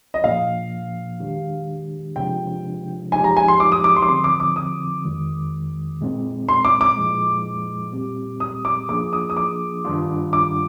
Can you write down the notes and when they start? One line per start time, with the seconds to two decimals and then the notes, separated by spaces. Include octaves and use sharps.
0.14 D#5
0.24 A#2 F3 A#3 F5
1.20 D#3 G#3 D4 G4
2.16 C3 F3 G#3 D4 F4 G5
3.12 F3 G#3 D#4 G4 G#5
3.24 A#5
3.37 G#5
3.48 C6
3.60 D6
3.72 D#6
3.84 D6
3.96 C6
4.02 D6
4.08 D3 F3 C4 C6
4.24 D6
4.40 D6
4.56 D#6
5.04 F2 D#3 G#3
6.01 A#2 G#3 C4
6.49 C6
6.65 D6
6.81 D6
6.97 A#2 F3 G#3
7.93 A#2 G3 C4 G4
8.40 D#6
8.65 D6
8.89 F3 A#3 D4 F4 G#4 D6
9.13 D#6
9.30 D#6
9.37 D6
9.85 G2 D#3 G3 D4 F4
10.33 D6